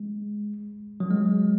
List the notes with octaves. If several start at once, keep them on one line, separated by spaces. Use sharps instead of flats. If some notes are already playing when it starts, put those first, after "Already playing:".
Already playing: G#3
F#3
G#3